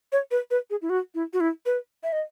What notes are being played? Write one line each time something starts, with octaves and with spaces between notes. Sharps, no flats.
C#5
B4
B4
G#4
E4
F#4
E4
F#4
E4
B4
E5
D#5